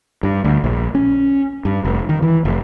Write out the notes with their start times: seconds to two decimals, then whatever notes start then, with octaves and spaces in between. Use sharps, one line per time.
0.23 G2
0.44 D2
0.64 A#1
0.95 C#4
1.65 G2
1.85 F1
2.09 D#3
2.22 E3
2.45 F1